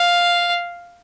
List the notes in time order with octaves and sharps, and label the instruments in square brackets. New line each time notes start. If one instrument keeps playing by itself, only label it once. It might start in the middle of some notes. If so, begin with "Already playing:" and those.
Already playing: [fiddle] F5